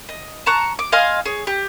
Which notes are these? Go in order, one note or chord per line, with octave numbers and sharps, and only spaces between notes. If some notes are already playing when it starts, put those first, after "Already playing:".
D#5
A5 A#5 C#6 F#6
D6
D#5 F5 G#5 C6
G#4 C#5
G4